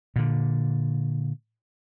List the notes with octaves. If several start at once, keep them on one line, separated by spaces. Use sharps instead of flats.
A#2 D3